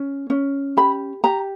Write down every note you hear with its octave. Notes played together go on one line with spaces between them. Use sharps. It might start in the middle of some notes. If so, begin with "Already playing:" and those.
Already playing: C#4
C#4
G4 B5
G4 A#5